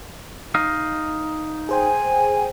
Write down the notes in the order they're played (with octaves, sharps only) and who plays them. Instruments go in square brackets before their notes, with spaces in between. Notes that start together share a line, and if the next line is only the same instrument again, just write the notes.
[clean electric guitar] D#4 D#5 F5
[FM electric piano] G#4 C5 G5 [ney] G#5